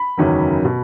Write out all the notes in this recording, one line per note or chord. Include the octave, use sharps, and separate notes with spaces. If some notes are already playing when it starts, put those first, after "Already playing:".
Already playing: B5
F#1 E2 D#3 F#3 C#4
B2